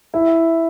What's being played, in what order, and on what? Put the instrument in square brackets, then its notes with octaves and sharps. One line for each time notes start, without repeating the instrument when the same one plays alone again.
[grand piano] E4